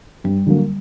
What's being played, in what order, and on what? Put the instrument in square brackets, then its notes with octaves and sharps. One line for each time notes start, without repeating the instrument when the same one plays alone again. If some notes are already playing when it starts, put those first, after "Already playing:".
[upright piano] G2 [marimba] G3
[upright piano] D3 F#3 A#3